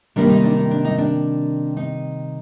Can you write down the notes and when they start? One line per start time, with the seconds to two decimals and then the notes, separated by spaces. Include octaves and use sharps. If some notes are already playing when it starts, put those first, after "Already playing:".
0.16 C3 D#3 G3 A#3 D4
0.29 D#4
0.43 D4
0.57 D#4
0.71 D4
0.84 D#4
0.98 D4
1.77 D#4